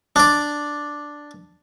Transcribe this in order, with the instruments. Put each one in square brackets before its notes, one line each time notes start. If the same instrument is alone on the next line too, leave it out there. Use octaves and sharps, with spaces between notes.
[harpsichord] D4 D5